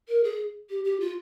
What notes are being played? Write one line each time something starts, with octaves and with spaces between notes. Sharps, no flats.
A#4
G#4
G4
G4
F4